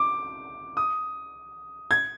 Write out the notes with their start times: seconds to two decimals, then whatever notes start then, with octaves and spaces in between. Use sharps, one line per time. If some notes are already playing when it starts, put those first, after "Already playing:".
Already playing: D6
0.77 D#6
1.91 G#6